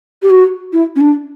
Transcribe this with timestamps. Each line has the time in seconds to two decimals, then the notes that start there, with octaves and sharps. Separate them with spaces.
0.23 G4
0.30 F#4
0.73 E4
0.96 C#4
1.01 D4